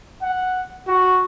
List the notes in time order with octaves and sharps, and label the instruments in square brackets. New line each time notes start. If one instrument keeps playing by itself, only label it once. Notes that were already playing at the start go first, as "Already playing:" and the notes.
[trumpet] F#5
F#4